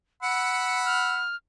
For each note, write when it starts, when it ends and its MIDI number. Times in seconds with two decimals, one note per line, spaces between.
0.23 1.24 78
0.23 1.24 83
0.23 1.24 88
0.23 0.79 97
0.85 1.36 89